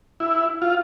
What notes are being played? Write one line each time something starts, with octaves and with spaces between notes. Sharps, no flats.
E4
F4